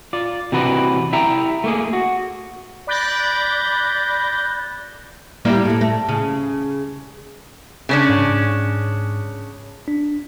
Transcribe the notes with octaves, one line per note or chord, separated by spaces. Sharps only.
F4 D5
C3 E3 F#4 B4 C5 D5
E4 G4 E5 G5 A#5
A3 A#3 G#4
F#4
D5 B5 F#6 G6 A6 A#6
G3 A#3 E4
A2 A3
A3
C#3
C#3 C#4 D4
G#2
D4